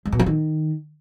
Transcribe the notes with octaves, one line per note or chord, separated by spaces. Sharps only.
G#3
B2
F3
D#3